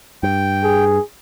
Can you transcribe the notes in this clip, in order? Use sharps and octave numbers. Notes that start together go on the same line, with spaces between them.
G2 G5
G#4